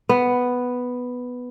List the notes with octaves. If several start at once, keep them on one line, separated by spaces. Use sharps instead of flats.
B3